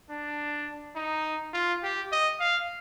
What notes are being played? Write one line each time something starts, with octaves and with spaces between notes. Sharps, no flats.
D4
D#4
F4
G4
D#5
F5